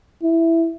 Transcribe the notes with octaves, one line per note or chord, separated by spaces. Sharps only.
E4